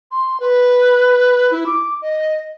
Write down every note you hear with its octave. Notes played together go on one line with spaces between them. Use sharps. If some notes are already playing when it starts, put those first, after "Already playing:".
C6
B4
E4
D6
D#5